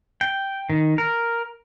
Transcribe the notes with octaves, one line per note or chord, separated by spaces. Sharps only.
G5
D#3
A#4